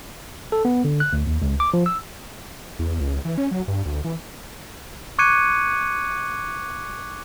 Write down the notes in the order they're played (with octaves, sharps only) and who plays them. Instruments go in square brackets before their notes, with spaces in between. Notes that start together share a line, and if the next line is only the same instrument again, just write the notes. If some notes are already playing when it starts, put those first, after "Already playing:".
[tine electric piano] A4
B3
D3
F#6
D2
D#2
C#2
D6
F3
E6
[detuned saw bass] E2
C#2
E3
C#4
F#3
G2
D2
E3
[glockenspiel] C#6 D6 F#6 G#6 C#7 D#7